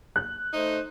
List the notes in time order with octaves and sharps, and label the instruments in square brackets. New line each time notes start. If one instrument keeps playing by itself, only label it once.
[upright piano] F#6
[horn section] A3 D#4 C5